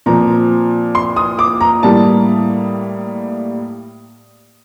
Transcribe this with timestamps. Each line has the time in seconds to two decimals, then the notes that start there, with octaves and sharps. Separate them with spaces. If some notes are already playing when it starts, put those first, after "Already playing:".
0.06 A#2 F3 C4 A#5
0.95 C6
1.16 D#6
1.39 D6
1.61 A#5
1.83 A2 G3 A#3 A5